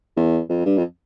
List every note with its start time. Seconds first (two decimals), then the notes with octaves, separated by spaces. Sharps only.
0.17 E2
0.49 F2
0.66 G2
0.78 F2